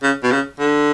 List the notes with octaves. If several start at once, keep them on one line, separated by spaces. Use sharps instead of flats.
C#3
B2
C#3
D3